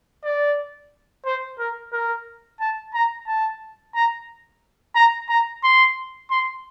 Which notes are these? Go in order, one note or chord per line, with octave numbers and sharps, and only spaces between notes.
D5
C5
A#4
A#4
A5
A#5
A5
A#5
A#5
A#5
C6
C6